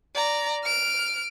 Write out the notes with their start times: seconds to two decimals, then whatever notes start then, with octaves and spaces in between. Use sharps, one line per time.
0.15 D5 A#5
0.64 F6 D7